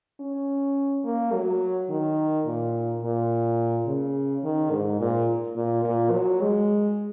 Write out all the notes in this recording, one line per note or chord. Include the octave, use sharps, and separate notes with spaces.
C#4
A#3
F#3
D#3
A#2
A#2
C#3
D#3
G#2
A#2
A#2
A#2
F#3
G#3